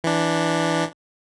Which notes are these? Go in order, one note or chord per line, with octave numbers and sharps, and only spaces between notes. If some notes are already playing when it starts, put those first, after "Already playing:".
E3 D4